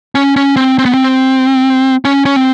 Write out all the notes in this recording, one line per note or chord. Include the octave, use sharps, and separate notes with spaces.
C#4
C#4
C4
C4
B3
C4
C#4
C#4
C4